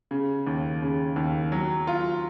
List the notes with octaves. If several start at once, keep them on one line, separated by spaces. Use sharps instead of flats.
C#3
D#2
C#3
D#2
F#3
F4